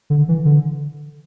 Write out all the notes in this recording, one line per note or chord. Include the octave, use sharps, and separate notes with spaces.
D3
E3
D3